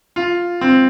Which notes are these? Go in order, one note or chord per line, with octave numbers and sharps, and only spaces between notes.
F4
C4